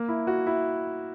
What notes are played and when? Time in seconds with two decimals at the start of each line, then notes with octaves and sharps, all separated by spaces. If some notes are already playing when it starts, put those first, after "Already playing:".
Already playing: A#3
0.08 E4
0.27 F#4
0.47 E4